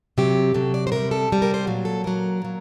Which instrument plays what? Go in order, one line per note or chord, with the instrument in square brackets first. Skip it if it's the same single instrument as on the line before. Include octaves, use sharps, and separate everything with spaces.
[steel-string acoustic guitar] C3 F#3 G4
C3 F#3 A4
D5
C5
C3 G3 A#4
A4
C3 G3
A#4
C5
A#2 F#3
A4
A#2 F#3 A#4
A#2 F#3